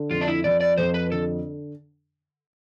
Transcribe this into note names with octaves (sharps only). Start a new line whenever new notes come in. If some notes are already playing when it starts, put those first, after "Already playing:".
Already playing: D3
F2 F4
D4
E4
F3 D5
D5
F2 C5
B4
D3 A4